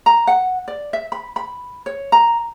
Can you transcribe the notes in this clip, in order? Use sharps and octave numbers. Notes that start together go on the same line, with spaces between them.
A#5
F#5
D5
E5
B5
B5
C#5
A#5